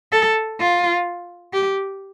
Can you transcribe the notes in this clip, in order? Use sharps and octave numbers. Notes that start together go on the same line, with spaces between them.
A4
F4
G4